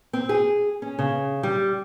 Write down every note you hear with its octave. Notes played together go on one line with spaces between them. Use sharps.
C4
G#4
C#4
C#3
G3